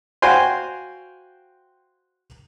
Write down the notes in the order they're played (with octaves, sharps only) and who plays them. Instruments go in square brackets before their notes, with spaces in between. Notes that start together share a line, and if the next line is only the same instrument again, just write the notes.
[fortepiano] F#4 C5 F5 G5 G#5 C6